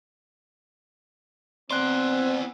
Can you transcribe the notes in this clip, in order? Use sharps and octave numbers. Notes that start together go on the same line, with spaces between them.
B3 C4 D5 C6 F#6